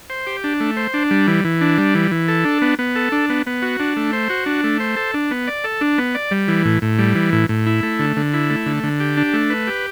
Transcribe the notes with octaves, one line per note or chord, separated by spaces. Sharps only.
C5
G4
D4
A3
C5
D4
G3
E3
E3
D4
G3
E3
E3
A4
D4
B3
B3
A4
D4
B3
B3
F#4
D4
A3
C5
F#4
D4
A3
C5
A4
D4
B3
D5
A4
D4
B3
D5
G3
E3
A2
A2
G3
E3
A2
A2
E4
A3
D3
D3
E4
A3
D3
D3
G4
D4
A3
B4
G4